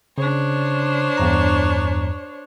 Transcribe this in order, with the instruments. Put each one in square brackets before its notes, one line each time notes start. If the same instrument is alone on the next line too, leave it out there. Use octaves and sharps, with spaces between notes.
[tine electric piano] C#3 [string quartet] D4 C5 C#5
[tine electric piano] E2 G2 A#5